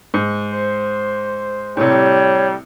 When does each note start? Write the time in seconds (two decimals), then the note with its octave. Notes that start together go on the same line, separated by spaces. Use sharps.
0.14 G#2
0.52 C5
1.77 A2 C3 G3 C#5